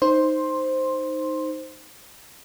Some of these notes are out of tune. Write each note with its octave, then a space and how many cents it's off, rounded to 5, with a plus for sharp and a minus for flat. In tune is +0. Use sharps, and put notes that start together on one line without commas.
D#4 +0 C5 +0 C6 +10